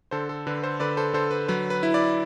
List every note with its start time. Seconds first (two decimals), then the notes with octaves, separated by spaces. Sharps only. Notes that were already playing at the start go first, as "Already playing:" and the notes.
0.11 D3 A4 C5
0.29 A4
0.47 D3 B4
0.63 A4 C5
0.80 D3 B4 D5
0.97 A4 C5
1.14 D3 A4 C5
1.31 B4
1.48 F#3 B4
1.70 B4
1.83 E4
1.94 B4 D5